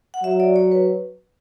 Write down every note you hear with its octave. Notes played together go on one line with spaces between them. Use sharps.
F#5
F#3 E5
D5
C#5
B4